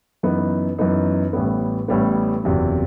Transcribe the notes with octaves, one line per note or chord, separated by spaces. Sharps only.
F#2 E3 B3 D#4
F#2 E3 B3 D#4
A1 A2 G3 B3
A1 A2 G3 B3
F#1 E2 C3 F#3